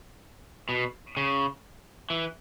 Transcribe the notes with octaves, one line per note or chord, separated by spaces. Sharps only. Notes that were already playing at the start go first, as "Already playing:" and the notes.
B2
C#3
E3